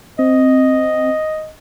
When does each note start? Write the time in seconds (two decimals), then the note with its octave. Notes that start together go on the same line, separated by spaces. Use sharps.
0.19 C4 D#5